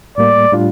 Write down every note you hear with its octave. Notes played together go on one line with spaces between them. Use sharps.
A2 G3 A#3 D5
A2 G3 D4 F4